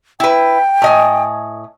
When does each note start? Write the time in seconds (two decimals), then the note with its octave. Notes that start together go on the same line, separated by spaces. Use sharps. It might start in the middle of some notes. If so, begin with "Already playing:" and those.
0.20 E4 B4 G5
0.82 A2 D#5 G#5